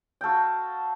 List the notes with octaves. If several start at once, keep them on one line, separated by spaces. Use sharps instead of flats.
F#4 A4 F5 G5